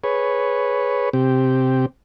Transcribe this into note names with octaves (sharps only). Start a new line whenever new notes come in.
G#4 B4 C#5
C3 C4 G4